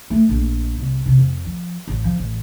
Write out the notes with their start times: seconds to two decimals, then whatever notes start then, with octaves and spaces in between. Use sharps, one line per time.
0.10 A3
0.29 A#1
0.80 C2
1.06 C3
1.18 F2
1.45 F3
1.88 A1
2.04 F3
2.18 A1